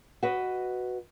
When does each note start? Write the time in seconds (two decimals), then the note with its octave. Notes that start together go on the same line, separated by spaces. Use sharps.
0.23 F#4 B4 D#5